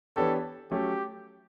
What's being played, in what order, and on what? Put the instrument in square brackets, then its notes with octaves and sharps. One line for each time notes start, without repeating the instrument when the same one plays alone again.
[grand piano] E3 B3 D4 G4 C#5 [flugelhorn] A4
[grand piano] F#3 A3 C#4 [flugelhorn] G4